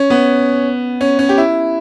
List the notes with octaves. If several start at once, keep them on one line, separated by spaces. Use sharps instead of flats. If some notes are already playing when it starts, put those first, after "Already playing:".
Already playing: C#4
B3
C#4
C#4
G4
E4